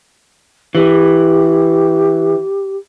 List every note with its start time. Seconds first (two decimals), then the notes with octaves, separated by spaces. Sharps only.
0.75 E3 G4